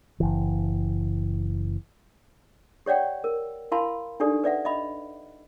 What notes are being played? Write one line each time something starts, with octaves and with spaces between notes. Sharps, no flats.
F#1 E3
G4 C#5 D5 F#5 G5
A#4
E4 A#4 F5 A5 B5 C6
D4 D#4 G4 A4 D5
B4 D5 E5 F#5
D#5 E5 B5